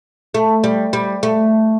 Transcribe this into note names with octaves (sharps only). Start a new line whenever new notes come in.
A3
G3
G3
A3